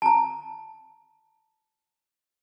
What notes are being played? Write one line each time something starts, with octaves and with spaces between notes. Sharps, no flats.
A5 A#5